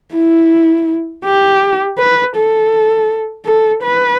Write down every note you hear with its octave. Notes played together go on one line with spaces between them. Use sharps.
E4
G4
B4
A4
A4
B4